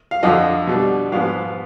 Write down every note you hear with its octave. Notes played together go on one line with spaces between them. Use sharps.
F5
F2 D3 F3 D#5
B2 G3 D4
G#2 F3 B3 F4 F5